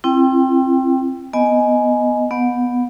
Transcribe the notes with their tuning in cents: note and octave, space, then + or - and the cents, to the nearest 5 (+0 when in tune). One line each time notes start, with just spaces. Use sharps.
C4 +25 E4 +30 G5 +0
B3 +0 D#5 +0 G#5 +15
B3 +0 F#5 -35